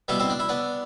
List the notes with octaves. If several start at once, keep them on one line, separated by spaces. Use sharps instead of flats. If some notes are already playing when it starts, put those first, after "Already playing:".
B2 G3 B3 E4 G4
C4 E4
D4
E4
B3 D4